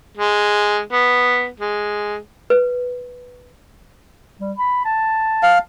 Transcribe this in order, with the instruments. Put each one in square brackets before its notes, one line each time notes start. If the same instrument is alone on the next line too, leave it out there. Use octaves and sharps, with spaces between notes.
[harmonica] G#3
B3
G#3
[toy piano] B4
[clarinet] G3
B5
A5
[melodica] F5